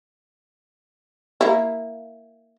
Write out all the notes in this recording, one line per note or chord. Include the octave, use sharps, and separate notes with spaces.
A#3 E4